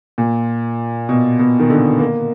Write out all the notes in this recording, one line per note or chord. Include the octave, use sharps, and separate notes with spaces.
A#2
B2
B2
D#3
D3
A#3